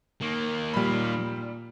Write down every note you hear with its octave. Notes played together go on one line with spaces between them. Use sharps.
D#3 A#3
A#2 G3 B5